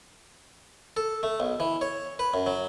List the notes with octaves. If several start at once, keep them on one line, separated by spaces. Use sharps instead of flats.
A4
A3
B1
E3
C#5
B4
F#2
F#3